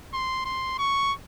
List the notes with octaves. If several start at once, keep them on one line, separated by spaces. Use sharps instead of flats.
C6
C6
C#6